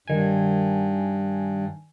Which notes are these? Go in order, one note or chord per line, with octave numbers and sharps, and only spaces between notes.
G2 D#3 G#5